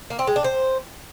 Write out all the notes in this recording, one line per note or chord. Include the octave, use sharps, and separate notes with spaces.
A#3
C4
G#3
D4
C5